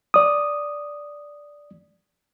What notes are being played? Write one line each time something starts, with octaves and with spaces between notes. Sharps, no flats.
D5 D#6